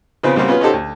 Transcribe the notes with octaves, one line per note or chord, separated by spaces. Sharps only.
C#3 F3 B3 C4 G#4
C#3 G3 A#3 C4 F#4
B3 C#4 F4 G#4 B4
C#4 D#4 F#4 G4 A4 C5
D2